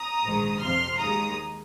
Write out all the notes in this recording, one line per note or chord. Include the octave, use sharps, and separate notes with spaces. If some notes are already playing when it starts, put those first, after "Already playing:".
Already playing: A#5 D#6
A#1 G#2 D#3 G#3
F2 C3 F3 C6 F6
D#2 D#3 G#3 A#5 D#6